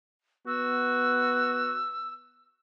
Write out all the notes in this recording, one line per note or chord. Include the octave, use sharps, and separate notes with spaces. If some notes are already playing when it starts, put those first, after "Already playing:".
B3 F#4 E6